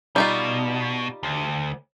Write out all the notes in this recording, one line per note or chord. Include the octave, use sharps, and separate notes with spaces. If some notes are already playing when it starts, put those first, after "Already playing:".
B2 G3 D#4 F4
D2